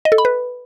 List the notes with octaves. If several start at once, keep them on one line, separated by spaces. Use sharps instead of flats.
D#5
A4
B5
B4